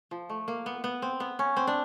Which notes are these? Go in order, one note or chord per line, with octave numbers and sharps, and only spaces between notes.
F3
A3
A#3
B3
B3
C4
B3
C#4
C4
D4